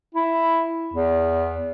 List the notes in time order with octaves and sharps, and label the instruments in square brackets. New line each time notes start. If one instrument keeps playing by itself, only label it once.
[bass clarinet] E4
E2